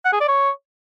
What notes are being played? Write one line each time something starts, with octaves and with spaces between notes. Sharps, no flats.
F#5
G#4
D5
C#5